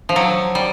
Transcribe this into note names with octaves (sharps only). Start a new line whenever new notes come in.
F3
F#3
G3